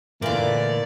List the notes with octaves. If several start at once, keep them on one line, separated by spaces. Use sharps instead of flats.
A#2 D3 E3 A3 A#4 D5